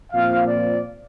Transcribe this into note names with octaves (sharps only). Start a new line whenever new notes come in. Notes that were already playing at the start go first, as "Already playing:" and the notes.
A#2 F3 C4 F5
D5